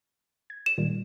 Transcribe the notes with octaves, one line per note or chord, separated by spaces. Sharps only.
G#6
E7
A#2 D#3 G3